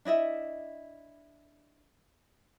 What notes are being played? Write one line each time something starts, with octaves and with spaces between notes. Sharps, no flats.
D4 E4 D#5 E5